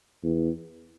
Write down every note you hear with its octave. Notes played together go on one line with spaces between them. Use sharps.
E2